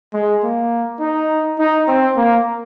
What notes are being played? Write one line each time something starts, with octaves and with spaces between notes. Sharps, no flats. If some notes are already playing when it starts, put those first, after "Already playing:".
G#3
A#3
D#4
D#4
C4
A#3